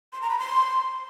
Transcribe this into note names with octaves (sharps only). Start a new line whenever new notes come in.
C6
A#5
B5
C6